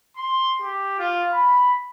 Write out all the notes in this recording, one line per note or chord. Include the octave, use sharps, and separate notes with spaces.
C6
G4
F4
B5